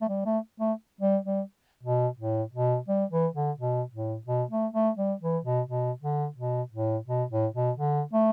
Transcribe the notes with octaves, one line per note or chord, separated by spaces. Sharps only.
A3
G3
A3
A3
G3
G3
B2
A2
B2
G3
E3
D3
B2
A2
B2
A3
A3
G3
E3
B2
B2
D3
B2
A2
B2
A2
B2
D3
A3